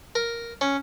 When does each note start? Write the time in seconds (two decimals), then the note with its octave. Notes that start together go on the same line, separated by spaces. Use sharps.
0.15 A#4
0.61 C#4